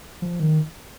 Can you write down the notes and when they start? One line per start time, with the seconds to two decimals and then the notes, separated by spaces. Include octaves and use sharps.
0.22 F3
0.40 D#3